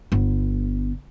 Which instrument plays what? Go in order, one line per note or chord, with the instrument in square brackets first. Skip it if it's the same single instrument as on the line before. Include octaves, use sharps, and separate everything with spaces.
[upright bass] G1 B3